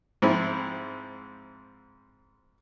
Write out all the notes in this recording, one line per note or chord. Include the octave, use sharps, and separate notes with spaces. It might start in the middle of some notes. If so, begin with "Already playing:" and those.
G#2 F3 C4 E4